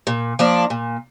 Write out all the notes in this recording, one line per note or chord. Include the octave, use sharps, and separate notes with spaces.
A#2
F3 A#3 D4
A#2